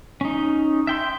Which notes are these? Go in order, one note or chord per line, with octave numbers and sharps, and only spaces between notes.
C#4 D#4
E5 G5 C6